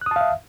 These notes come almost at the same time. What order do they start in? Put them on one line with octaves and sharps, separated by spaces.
F#6 D#6 A5 F5 E5